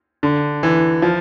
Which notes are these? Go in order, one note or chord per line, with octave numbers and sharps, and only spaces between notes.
D3
E3
F3